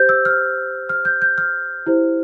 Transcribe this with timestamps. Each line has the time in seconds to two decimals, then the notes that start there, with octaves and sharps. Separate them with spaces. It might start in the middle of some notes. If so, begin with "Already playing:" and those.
Already playing: G4 C5 G6
0.09 E6
0.25 F6
0.89 F6
1.05 G6
1.22 G6
1.38 F6
1.86 E4 G4 C5